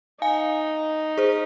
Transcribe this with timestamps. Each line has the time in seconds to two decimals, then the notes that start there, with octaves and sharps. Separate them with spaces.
0.22 D#4 F5 G#5
1.18 G#4 C5